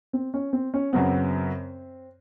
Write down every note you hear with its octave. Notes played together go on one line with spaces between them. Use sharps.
C4
C#4
C4
C#4
F#2 C#3 F#3 B3 C4